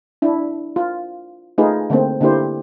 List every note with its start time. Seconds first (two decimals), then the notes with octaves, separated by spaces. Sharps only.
0.22 D4 E4
0.76 F4
1.58 A3 D#4 F4 G#4 B4
1.90 D3 A3 A#3 C4
2.21 D3 A#3 D4 E4 G4 C5